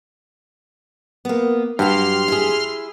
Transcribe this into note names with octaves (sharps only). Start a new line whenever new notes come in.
A#3 B3
G2 F#3 F#4 G4 C6 F6
E4 G#4